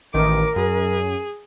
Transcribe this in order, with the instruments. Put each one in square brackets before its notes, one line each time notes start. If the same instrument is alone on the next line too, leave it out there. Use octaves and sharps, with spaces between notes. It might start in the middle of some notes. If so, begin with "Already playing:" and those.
[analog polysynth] A1 D#3 [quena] A#4 [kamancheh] D6
[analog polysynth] F#2 [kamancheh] G#4